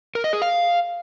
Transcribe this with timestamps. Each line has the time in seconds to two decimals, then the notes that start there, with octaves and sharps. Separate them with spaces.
0.15 A#4
0.24 D#5
0.33 G#4
0.42 F5